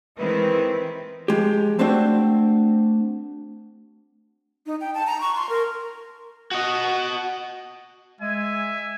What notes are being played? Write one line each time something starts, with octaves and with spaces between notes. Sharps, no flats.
D#3 E3 G#3 C4 E4 B4
F3 G#3 G4
A3 C4 D4 F#4 C5 G5
D#4
G5
A5
A#5
C#6
C6
A#4
F#4 D#5
G#3 E5 G#5